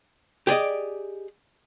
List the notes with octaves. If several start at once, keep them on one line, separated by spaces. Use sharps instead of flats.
G4 G#4 D5 D#5